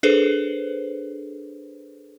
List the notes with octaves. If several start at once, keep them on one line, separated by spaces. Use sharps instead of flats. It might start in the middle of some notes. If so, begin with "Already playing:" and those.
D4 G#4 A4 B4 C5